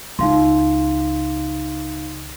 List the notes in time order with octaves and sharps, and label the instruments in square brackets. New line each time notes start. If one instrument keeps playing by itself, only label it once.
[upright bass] C#2 [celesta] D#4 F5 C6